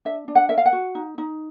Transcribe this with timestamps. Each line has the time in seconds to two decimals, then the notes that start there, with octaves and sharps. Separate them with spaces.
0.05 D4 E5
0.28 D4
0.35 F#5
0.49 A#4 E5
0.58 F5
0.66 F#5
0.73 F#4
0.95 D#4
1.18 D#4